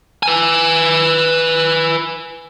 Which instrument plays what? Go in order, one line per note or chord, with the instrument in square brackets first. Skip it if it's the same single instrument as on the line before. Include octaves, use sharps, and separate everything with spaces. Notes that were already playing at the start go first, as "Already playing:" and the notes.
[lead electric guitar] B4 G#5